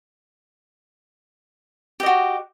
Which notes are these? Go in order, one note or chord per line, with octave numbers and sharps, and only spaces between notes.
F#4 G4 D#5